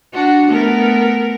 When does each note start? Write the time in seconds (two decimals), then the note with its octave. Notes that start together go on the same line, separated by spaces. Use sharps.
0.13 D4 F#4
0.50 A3 B3 A#4